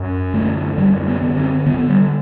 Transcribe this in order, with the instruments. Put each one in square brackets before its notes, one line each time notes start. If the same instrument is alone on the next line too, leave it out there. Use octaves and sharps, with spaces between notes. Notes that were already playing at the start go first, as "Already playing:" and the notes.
Already playing: [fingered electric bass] F#2
D3 A3
F#2 G3
B3
D3
C4
D3 B3
G3